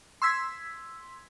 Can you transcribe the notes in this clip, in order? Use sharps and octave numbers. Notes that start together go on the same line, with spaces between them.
C6 E6 G#6 B6